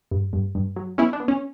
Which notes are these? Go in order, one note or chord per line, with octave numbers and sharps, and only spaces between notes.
G2
G2
G2
F#3
B3 C#4 E4
D4
B3
C#4